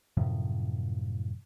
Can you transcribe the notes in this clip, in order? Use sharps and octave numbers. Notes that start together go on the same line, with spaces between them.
F#2 A2 C3 F3